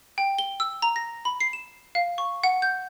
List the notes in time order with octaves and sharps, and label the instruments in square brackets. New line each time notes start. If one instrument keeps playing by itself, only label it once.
[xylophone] G5
G7
E6
A#5
A#6
B5
C7
E7
F5
C#6
F#5
G6